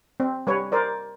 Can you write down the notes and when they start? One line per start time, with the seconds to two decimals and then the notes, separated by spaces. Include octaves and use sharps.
0.20 C4
0.47 G3 B4 C#5
0.72 A#4 C5 D5